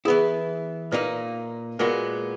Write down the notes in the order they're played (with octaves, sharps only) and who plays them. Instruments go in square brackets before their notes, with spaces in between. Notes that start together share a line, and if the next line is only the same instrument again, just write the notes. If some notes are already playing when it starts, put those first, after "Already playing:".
[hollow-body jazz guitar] E3 B3 E4 [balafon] G#4
[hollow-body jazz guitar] A#2 A#3 D#4 [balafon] B4
[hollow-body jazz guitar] A#2 G#3 B3 F#4 [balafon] A#4